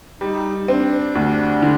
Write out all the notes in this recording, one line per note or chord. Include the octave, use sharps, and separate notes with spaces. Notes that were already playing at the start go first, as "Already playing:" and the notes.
G3 D#4
C4 D4
D2
D3